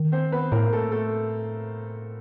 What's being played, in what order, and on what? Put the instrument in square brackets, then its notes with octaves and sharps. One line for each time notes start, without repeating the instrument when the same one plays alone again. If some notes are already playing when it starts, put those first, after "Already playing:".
Already playing: [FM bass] D#3
[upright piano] C4 C5
B3 B4
[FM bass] A2 [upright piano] A#3 A#4
[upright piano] A3 A4
A3 A4